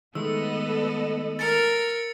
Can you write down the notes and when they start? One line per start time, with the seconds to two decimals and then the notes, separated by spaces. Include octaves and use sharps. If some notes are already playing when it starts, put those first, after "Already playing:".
0.15 D#3 G#3 A3 B3 A4 D#5 E6
1.39 A#4 A6 C#7